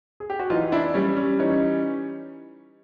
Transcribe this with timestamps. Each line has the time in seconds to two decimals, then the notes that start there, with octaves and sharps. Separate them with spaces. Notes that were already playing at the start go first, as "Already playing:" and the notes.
0.20 G#4
0.30 G4
0.39 F#4
0.50 E3 D#4 F4
0.72 D4 E4
0.94 G3 C#4
1.17 C#4
1.39 E3 C#4 D#4